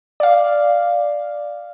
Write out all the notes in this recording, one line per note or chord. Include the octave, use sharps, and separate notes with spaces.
D5 F5